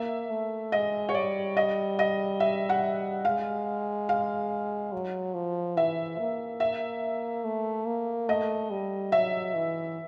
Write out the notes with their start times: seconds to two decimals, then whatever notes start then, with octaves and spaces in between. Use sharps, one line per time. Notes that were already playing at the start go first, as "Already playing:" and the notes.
Already playing: A#3 E5
0.30 A3
0.72 G#3 D#5
1.09 C#5
1.14 G3 D5
1.57 D#5
1.99 D#5
2.40 E5
2.69 F#5
3.24 G#3 F5
4.09 F5
4.92 F#3
5.35 F3
5.77 E3 E5
6.18 A#3
6.60 E5
7.44 A3
7.87 A#3
8.29 A3 D#5
8.70 G3
9.12 F#3 E5
9.55 E3